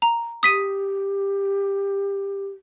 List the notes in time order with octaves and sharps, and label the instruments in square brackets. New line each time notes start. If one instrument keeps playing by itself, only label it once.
[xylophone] A#5
[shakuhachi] G4 [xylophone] D#6 B6 D#7